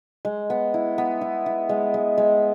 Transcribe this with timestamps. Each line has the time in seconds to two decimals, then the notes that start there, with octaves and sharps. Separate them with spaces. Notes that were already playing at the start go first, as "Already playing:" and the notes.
0.25 G#3
0.50 B3
0.74 E4
0.98 B3
1.21 E4
1.46 E4
1.69 G#3
1.94 G#3
2.18 G#3